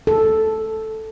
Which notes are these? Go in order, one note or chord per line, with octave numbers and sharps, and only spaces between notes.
A4